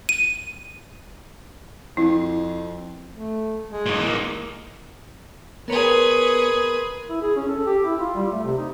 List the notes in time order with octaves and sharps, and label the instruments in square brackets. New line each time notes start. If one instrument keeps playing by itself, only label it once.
[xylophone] D#7
[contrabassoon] F2 [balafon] E4
[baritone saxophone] A3
G#3
[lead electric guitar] A#2 D#4
E3 A#3
[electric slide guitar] B3 C#5 [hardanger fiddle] G#4 B4 [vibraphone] A#4 A#5 C6
[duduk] E4
G#4
C#4
A4
G4
E4
F4
G3
A3
C3
D#4